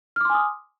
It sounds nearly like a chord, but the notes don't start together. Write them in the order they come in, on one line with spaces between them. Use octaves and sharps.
F6 D6 C6 G#5 D#6